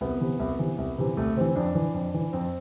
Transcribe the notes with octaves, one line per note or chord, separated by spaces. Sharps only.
C2 B3
C3 E3
C2
C3 E3
C2
C3 E3
C2 A3
C3 E3 C4
F2 D4
E3
F2
E3
F2 C4